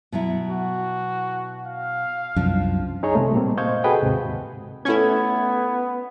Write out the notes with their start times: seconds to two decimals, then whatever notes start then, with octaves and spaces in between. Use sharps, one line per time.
0.12 B2 F#3 E4
0.48 F#4
1.67 F5
2.36 C2 F#2 F3 D4
3.03 D#4 G#4 C#5 D#5 A#5
3.15 C3 G#3 A3
3.33 A#2 G3 A#3 C4
3.57 C5 D#5 F5 C#6 G6 G#6
3.84 F#4 G#4 A4 B4 D#5 G5
4.02 D#2 G#2 C3
4.85 A3 B3 C#4 E4 G#6